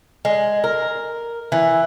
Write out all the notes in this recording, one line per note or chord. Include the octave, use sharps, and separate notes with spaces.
G#3
A#4
E3